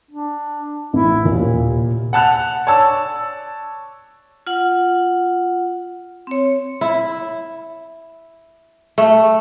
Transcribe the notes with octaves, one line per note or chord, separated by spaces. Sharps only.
D4
A1 E4
D#2 A#2
C3
F#5 A5 F#6 F7
C#5 D5 A5 E6
F4 F#5
C4 C#5
E4
A3